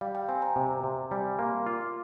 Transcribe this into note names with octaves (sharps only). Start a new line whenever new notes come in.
G3 F5
G5
C4 G#5
A#5
C3
C3
G3 G#5
A#3 C6
F4 D6